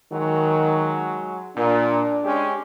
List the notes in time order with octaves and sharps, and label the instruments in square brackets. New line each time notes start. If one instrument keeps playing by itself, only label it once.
[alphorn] D#3 [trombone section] F#3 G#3 F#4
[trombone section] A#2 [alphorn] D4
[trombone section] G#3 C#4 G4